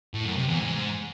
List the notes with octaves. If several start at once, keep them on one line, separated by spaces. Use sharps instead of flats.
A2
F#2
C3
E2
G#2